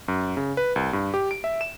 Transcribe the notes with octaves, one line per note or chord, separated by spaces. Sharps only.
F#2
C#3
B4
C2
G2
G4
D7
E5
E7